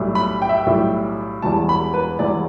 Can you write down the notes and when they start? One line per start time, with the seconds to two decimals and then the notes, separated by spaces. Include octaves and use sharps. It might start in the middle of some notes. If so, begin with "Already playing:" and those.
Already playing: B1 A2 G3 E4
0.15 B5
0.42 G5
0.49 E5
0.57 G5
0.66 B1 A2 G3 E4
1.42 E1 E2 E3 G3 A5
1.69 B5
1.94 B4
2.19 E1 E2 E3 G3 D5